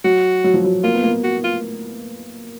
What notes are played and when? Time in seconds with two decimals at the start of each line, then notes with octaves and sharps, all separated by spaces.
0.04 F#3 F#4
0.44 F#3
0.54 F3
0.64 F#3
0.84 A#3 F4
0.94 B3
1.04 A#3
1.24 F#4
1.44 F4